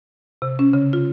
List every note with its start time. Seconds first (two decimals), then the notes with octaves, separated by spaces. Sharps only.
0.42 C3
0.59 C#4
0.73 C#3
0.93 F4